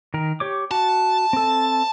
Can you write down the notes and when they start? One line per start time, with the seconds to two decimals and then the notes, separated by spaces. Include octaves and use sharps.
0.14 D#3 A#4
0.40 G4 C#5 D6
0.71 F#4 A5
1.33 C4 A4